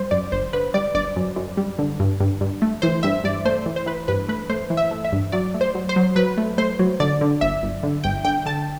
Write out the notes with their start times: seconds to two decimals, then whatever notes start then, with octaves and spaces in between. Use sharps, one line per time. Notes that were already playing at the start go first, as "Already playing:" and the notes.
Already playing: G3 C5
0.11 F#2 D5
0.32 G1 C5
0.53 D3 B4
0.74 G3 D5
0.95 G1 D5
1.16 F#2
1.36 F#2
1.57 G3
1.79 D3
2.00 G2
2.20 G2
2.41 G2
2.62 A3
2.82 E3 C5
3.03 G2 E5
3.24 G2 D5
3.45 A3 C5
3.66 E3
3.76 C5
3.86 E3 B4
4.08 G2 B4
4.28 A3 B4
4.50 A3 C5
4.70 E3
4.77 E5
4.91 A3
5.05 E5
5.12 G2
5.32 F#3 D5
5.54 A3
5.61 C5
5.75 F#3
5.89 C5
5.96 F#3
6.16 F#3 B4
6.37 A3
6.58 A3 C5
6.79 F#3
7.00 D3 D5
7.21 D3
7.41 G1 E5
7.63 G1
7.83 D3
8.04 G1 G5
8.25 D3 G5
8.46 D3 A5